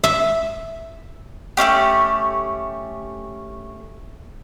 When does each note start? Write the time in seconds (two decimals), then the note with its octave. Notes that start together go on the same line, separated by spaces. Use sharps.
0.04 E5
1.57 A3 C4 C#4 G4